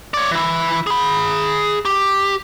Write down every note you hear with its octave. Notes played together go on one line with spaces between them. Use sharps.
C#5 D5
E3 E4
G#4 B5
G4